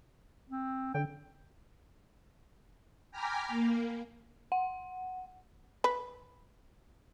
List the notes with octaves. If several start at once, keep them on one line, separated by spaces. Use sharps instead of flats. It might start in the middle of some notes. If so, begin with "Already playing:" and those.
C4
D3 G5
G5 G#5 A#5 B5 D6 F6
A#3
F#5
B4